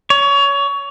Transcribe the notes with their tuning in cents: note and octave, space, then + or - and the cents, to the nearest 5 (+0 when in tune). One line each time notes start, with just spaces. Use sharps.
C#5 +25